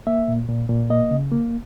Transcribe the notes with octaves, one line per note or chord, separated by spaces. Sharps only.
A#3 E5
A#2
A#2
A#2
A#3 D#5
C#3
A#3